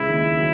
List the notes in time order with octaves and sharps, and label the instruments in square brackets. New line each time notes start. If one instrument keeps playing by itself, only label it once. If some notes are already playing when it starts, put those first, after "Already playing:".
Already playing: [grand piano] C#2 C#3 [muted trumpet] E4
[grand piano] D#2 D#3
F#3